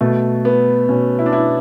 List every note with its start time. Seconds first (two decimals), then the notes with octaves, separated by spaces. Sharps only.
0.01 B2 A3
0.45 B3
0.89 B2 C#4
1.19 E4
1.26 D4
1.33 E4